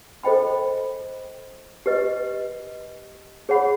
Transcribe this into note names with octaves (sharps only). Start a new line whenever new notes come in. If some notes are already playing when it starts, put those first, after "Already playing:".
A4 C5 D#5 G5 B5
G4 B4 D#5
G#4 C#5 F#5 B5